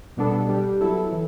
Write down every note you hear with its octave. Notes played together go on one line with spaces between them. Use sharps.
B2 G3 B3 D4 A4
G3 D4 G4
F#3 B3 E4 A4
E3